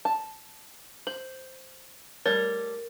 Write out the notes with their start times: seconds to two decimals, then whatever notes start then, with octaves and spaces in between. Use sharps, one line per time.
0.05 A5
1.07 C5 F#7
2.26 G3 A3 A#4 C#5 A6